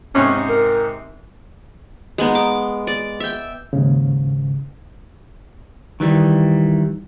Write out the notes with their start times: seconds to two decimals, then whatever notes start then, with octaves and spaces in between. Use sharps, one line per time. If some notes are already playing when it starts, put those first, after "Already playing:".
0.15 G#2 C3 C#4 D#4
0.49 A#4
2.18 G#3 B3 D#4
2.35 D6
2.87 D5
3.20 E5 G5
3.73 D#2 G#2 C#3
6.00 D#3 E3 G3